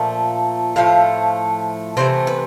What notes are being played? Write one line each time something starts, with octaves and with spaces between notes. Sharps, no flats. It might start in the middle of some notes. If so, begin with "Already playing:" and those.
Already playing: A#2 F3 A3
A2 F3 A3 F5
C3 E3 A3 C5
B4